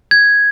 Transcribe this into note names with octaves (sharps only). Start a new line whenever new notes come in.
G#6